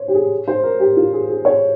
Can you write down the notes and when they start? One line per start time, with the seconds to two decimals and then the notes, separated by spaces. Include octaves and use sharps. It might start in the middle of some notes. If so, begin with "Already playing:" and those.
Already playing: C5 C#5
0.08 G4
0.14 G#4
0.48 C5
0.63 A#4
0.80 G4
0.97 F4
1.13 G#4
1.29 G#4
1.45 C#5